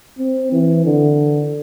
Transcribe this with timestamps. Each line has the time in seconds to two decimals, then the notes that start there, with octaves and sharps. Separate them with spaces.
0.19 C4
0.52 E3
0.85 D3